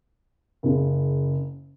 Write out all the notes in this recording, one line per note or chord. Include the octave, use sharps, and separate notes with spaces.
F#1 C#3